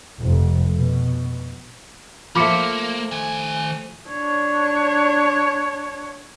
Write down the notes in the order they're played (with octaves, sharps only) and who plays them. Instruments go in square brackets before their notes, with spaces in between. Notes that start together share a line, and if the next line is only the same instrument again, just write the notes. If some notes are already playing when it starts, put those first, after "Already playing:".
[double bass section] F1
B2
[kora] F3 A3 [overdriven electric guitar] A#3 [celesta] B5 D6 C#7
[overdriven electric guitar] D#3 G#5
[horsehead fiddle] D4 C#5